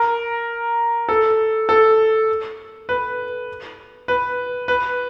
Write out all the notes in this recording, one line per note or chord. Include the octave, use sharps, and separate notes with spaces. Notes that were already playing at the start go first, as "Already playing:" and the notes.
Already playing: A#4
A4
A4
B4
B4
B4